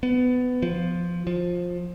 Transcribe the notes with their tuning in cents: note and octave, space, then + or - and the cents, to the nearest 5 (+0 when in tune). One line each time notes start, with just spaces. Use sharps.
B3 +20
F3 -5
F3 +15